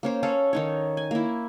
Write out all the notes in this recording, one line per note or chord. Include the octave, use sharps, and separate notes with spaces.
A#3 C#4 C5
C#4 A4 F5
D#3 D#4 C#5
G#5
A#3 E4